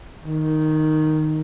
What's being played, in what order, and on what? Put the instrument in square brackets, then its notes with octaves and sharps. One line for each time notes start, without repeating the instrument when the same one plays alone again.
[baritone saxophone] D#3